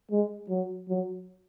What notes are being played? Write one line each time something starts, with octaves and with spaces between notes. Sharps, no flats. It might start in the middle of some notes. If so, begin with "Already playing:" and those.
G#3
F#3
F#3